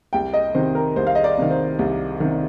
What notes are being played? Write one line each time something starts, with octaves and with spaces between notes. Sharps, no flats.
C2 G5
D#5
C3 D#3 C5
A#4
C2 C5
F5
D#5
D5
C3 D#3
C5
C2
C3 D#3